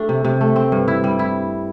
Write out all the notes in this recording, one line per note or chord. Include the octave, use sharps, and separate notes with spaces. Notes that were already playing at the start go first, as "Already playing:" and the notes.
Already playing: A3 D4 G4
C3
C3
A3
C4
G2
E4
G3
E4